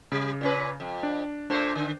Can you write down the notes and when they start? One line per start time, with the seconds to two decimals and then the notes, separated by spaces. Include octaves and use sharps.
0.12 C#3 G3
0.41 A#2 C#4 B4
0.80 F2
1.03 D4
1.50 A#2 A3 D4 C5
1.76 D3